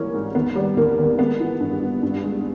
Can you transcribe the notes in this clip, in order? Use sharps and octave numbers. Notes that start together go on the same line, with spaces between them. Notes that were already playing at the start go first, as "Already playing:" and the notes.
Already playing: G#2 E3 G3 A#3 C#4
G#2
D#2 B3
G3
D#2 A#3
D#2
G#3 B3
E3
G2
G2
G2
G#3